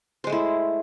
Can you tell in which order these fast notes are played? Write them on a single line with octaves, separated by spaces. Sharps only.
C5 G#3 A3 E4